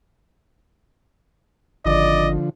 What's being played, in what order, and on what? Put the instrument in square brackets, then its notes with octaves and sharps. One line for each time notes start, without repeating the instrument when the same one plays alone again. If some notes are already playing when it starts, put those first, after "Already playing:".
[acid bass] G#1 [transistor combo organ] D3 F3 [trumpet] D5 [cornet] D#5